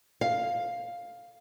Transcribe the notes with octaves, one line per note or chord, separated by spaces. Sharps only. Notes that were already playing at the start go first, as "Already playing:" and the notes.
F5